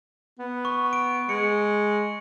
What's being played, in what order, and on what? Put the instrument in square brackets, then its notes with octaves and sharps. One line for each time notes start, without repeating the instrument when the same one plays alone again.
[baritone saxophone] B3
[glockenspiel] C#6
D7
[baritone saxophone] G#3 [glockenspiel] C#7